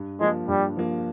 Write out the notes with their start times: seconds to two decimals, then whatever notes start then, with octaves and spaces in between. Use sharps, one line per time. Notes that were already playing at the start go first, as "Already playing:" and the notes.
Already playing: G2
0.21 F3 G#3 A#3
0.48 G2 G3
0.77 F3 A#3